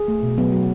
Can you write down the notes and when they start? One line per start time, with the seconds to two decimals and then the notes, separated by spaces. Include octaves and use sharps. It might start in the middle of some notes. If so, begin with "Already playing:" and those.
Already playing: G#4
0.08 A3
0.23 B2
0.38 F#3 B3
0.53 F#3